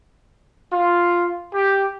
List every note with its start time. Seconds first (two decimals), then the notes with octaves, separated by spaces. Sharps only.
0.72 F4
1.53 G4